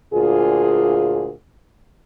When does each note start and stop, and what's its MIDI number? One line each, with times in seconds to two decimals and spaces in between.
0.13 1.31 38
0.13 1.31 46
0.13 1.31 65
0.13 1.31 68